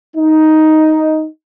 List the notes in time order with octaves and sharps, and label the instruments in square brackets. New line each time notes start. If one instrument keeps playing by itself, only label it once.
[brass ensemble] D#4